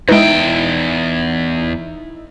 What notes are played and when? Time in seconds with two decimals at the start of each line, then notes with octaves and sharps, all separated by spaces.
0.09 E2 G#3 D#4 E4 B4 E5 G5